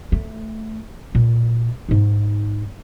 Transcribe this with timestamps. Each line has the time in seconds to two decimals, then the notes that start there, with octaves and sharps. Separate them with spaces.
0.12 A3
1.15 A#2
1.89 G#2 D#4